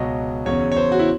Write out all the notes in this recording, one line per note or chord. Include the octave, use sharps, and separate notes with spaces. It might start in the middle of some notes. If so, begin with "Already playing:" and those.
Already playing: C#2 B2 F#3 D#5
E2 C#3 F#3 C#5
C#5
C5
F#4
E4